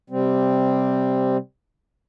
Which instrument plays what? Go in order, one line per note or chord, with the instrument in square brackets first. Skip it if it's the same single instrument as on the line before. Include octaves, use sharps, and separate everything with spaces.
[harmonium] C3 G3 C4